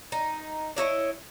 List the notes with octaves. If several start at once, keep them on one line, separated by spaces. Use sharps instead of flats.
D#4
D4 E4 C#5 D#5